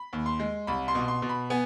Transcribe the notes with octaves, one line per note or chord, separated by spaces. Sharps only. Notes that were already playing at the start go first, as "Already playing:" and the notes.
Already playing: B5
D#2
C6
G#3
C2 B5
C6
B2
C6
B2
B5
B3 G#5